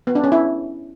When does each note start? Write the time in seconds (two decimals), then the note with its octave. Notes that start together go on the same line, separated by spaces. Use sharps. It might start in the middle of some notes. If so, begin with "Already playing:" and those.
0.07 B3
0.15 D4
0.24 C#4
0.32 E4